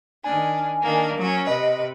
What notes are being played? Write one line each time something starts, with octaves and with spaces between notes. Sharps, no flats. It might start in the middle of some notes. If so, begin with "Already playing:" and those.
D#3 D4 G#5
D#3 A#3 D4
F#3 C#4
C3 B4 D#5